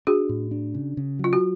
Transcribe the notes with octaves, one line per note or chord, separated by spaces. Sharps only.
D4 F#4 G#4
A2
D4
C#3
C#3
F#3
F4
F#4